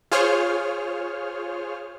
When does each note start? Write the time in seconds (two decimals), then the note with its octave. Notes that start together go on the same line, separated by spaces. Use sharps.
0.12 F4 G#4 C5 C#5 F6